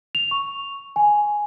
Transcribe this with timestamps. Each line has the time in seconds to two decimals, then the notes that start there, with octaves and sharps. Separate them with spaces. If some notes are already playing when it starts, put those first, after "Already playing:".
0.15 F7
0.31 C#6
0.96 G#5